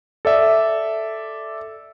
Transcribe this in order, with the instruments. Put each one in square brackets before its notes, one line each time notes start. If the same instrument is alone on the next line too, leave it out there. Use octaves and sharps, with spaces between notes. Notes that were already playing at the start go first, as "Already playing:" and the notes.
[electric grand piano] A4 D5 E5